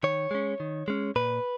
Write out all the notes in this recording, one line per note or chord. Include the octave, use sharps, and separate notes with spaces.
D#3 C#5
G#3 C#4
D#3
G#3 C#4
A#2 B4